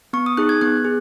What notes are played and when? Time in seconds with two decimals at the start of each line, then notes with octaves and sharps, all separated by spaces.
0.13 B3 C#6
0.26 D#6
0.37 D#4 G#4 F#6
0.49 G#6
0.61 B3 F#6
0.85 G#4